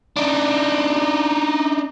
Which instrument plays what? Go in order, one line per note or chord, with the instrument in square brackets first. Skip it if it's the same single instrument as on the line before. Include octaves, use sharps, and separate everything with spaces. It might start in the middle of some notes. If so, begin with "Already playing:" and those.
[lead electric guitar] D4 D#4